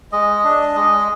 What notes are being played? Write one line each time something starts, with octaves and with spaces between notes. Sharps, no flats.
G#3 D#5
D4
G#3